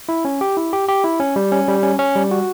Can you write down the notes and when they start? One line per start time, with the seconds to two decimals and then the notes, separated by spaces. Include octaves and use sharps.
0.09 E4
0.25 C#4
0.41 G4
0.57 E4
0.73 G4
0.88 G4
1.04 E4
1.20 C#4
1.36 G3
1.52 C#4
1.68 G3
1.83 C#4
1.99 C#4
2.15 G3
2.31 F#4